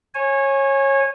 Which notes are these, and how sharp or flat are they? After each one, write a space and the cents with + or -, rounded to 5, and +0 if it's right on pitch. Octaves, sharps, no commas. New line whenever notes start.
C#5 -20 G#5 +0